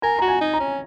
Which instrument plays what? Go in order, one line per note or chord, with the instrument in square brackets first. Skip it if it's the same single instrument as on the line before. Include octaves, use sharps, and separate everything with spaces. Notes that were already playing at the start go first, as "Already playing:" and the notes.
[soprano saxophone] A#4 [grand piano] G#5
[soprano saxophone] F#4 [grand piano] A#5
[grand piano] G#5
[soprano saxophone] D#4
[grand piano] A#5
[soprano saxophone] C#4